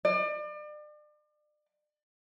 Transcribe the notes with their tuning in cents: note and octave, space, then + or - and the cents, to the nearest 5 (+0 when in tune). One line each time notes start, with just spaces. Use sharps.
D5 +35